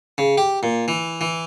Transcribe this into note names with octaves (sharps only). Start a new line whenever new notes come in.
C#3
G4
A#2
E3
E3